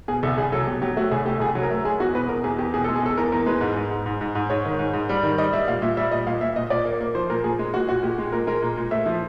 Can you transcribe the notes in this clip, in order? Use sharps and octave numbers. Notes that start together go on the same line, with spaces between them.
B2 G#4
C2 A4
C2 G#4
F#3 A4
B2 G4
F#3 G4
A3 F#4
C2 G#4
A3 G4
C2 G#4
F#3
A#4
A3
G#3 G#4
E2 F#4
B2 B4
B2 A#4
E2 G#4
E2 G4
B2 G#4
A4
G#3
G#4
E2 A4
E2 A#4
E2 A#4
G#3 B4
G#2
G#2
G#2
G#2
G#2
G#2
G#2 C#5
D#3
G#2
G#2
G3
D#3
G3 D#5
G3 E5
A#2 F5
A#2 E5
G3 E5
A#2 D#5
A#2 F5
A#2 E5
A#2 D#5
A#2 D5
A#3
A#3
F3 C5
A#2 A#4
A#2 G#4
G#3
A#2 F#4
A#2 F#4
A#2 G4
G#3
A#2 A#4
G#3 A#4
A#2
A#2
A3 E5
F3